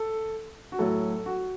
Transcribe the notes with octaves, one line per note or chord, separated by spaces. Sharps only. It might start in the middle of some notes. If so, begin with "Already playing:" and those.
Already playing: A4
F#4
A2 F#3 A4
F#4